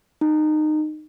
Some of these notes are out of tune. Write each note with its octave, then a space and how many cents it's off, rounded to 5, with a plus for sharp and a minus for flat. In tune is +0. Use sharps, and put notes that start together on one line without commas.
D#4 -20